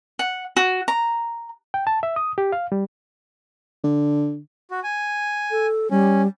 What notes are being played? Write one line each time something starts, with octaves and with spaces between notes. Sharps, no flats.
F#5
F#4
A#5
G5
A5
E5
D#6
G4
F5
G3
D3
F#4
G#5
A4
G3 C#4